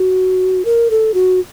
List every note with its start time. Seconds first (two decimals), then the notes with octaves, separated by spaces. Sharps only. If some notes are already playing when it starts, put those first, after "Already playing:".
Already playing: F#4
0.65 A#4
0.91 A4
1.14 F#4